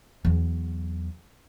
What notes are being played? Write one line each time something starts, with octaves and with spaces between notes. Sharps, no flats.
E2 F#3